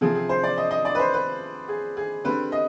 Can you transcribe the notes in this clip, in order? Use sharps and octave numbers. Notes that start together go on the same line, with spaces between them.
C3 F3 C4 G#4
G#4
C5
D5
D#5
D#5
D5
B4
C5
B4
G#4
G#4
D3 G3 C4 B4
D#5